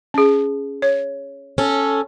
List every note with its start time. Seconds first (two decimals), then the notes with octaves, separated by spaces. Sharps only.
0.14 C#4 G#4
0.82 C#5
1.58 C#4 A4